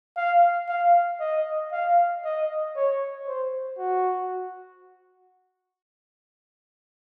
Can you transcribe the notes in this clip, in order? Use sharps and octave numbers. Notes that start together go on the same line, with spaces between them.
F5
F5
D#5
F5
D#5
C#5
C5
F#4